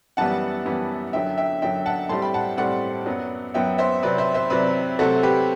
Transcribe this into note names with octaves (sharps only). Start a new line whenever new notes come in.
F#2 E3 G3 B3 F#5 A5
F#2 E3 G3 B3
F#2 D3 F#3 E5 G5
E5 G5
F#2 D3 F#3 E5 G5
F#5 A5
A2 G3 C4 A5 C6
G5 B5
F#5 A5
A2 G3 C4 D5 F#5
F#2 F#3 B3
F#2 F#3 B3 E5 G5
C5 E5
C3 F#3 C4 B4 D5
C5 E5
C5 E5
C3 F#3 C4 B4 D5
C3 F#3 A3 C4 F#4 A4
G4 B4